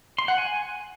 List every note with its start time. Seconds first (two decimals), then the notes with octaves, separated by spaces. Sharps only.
0.18 C6
0.28 F#5
0.38 G#5